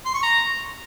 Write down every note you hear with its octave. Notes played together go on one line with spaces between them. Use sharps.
C6
C#6
A#5